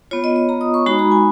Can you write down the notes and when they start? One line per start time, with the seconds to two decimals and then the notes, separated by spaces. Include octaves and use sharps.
0.11 B3 F4 C#5
0.24 D#5
0.36 D#5
0.49 A#5
0.61 D#6
0.74 C#6
0.86 G#3 D#4 F#4 B5
0.99 A#5
1.11 G#5